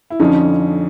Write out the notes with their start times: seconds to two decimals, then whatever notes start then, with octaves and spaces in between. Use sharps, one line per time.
0.10 E4
0.20 F2 D3 F3 C#4 D#4